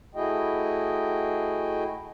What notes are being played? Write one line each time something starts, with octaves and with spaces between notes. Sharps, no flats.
A3 E4 F#4 G#4 D#5 G5